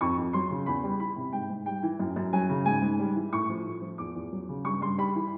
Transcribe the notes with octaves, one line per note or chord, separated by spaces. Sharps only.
F2 C#6
F2
F#3 C6
C#3
E2 B5
G3
E3 B5
C3
G#2 G5
G#2
G3 G5
E3
F#2
F#2
F#3 G#5
C#3
G#2 G#5
G#2
G3
E3
A2 C#6
F3
A2
F3
E2 D6
E2
F#3
C#3
G2 C#6
G2 C6
G3 B5
E3